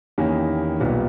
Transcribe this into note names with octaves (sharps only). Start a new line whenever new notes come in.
E2 D#3 A#3 C#4 G4
B1 A#2 G3 B3 G4